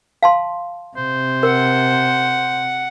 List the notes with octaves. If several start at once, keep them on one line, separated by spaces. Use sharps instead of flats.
F5 A5 C6
C3 C5
A#4 F#5